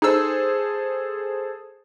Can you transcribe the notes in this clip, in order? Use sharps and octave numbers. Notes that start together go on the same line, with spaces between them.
D#4 G#4 A4 C5 E6